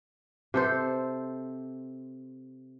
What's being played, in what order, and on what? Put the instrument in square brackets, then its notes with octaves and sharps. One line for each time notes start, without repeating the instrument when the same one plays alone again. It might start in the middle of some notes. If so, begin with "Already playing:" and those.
[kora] C3 A4 C5